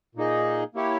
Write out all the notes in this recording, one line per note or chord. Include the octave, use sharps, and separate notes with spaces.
A#2 A#3 D#4 G#4 D#5
A#3 E4 G4 C#5